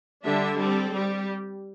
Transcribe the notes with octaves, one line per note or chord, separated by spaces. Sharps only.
D3 G3 D4 E5
G3 C4 A4
G3 G4